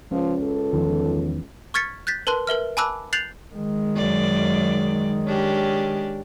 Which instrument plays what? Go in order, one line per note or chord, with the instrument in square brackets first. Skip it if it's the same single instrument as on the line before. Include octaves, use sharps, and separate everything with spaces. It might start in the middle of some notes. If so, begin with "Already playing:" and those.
[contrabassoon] C#2 [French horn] F3 [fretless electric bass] C#4
[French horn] A4
[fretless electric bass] E2 D#3 F3
[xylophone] C#6 F6 G#6 A6 B6 C#7
F#6 G6 A6 B6
A#4 B4 A5 C6 F#6
A#4 B4 E5 F6
G#5 A5 B5 D6 E6 F#6
F#6 G6 A6 C7 F7 F#7
[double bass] D#3 G#3
[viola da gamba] F#2 D5
C#4 D4 G4